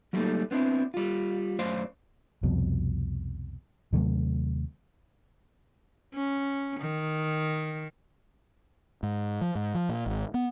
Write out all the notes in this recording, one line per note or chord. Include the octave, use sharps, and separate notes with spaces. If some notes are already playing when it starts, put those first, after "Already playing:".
F#3 G3 A3 A#3 D#4 A4
B3 C4 D4 E4
G3 F4
F#2 A3 C5 D5 F5
C2 F2 B2
D#2 C3 F#3 A3
C#4
D#3
G#2
F3
G#2
F3
A#2
G#1
B3